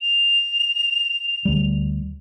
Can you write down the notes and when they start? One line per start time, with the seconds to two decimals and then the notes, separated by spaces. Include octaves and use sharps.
0.01 F7
1.45 D2 G3